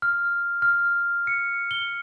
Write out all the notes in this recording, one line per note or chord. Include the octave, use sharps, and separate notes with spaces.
F6
F6
C#7
G7